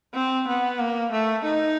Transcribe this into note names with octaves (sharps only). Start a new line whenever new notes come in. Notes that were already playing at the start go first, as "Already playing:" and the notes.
C4
B3
A#3
A3
D#4